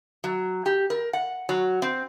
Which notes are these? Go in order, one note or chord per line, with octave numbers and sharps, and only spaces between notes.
F#3
G4
A#4
F#5
F#3
C4